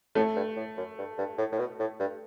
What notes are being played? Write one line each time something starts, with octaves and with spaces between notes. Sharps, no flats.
A2 A3
G2
A2
F#2
G2
G2
A2
A2
B2
A2
G2